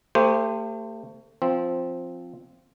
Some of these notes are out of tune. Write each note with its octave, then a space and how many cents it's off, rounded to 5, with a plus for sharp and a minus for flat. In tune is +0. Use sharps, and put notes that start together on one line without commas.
A3 +35 G4 +25 C5 +0
F3 +0 C4 +0